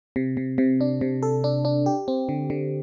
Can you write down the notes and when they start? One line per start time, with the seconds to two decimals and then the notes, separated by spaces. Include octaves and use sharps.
0.16 C3
0.37 C3
0.58 C3
0.81 D4
1.01 C3
1.23 A4
1.44 D4
1.65 D4
1.86 G4
2.08 C4
2.29 D3
2.50 D3